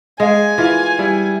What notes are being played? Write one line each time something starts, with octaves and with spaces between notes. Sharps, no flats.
G#3 D#5 F5 G#5
E3 F4 A#4 F5
G3 E4